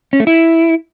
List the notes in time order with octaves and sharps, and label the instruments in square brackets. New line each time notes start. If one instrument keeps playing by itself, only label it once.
[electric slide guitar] C#4
A3
E4